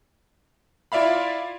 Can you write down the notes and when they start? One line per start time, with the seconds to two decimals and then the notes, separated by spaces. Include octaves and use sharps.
0.92 E4 F4 D5 E5 F5 B5